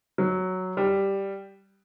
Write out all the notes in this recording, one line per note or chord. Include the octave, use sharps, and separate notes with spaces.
F#3
G3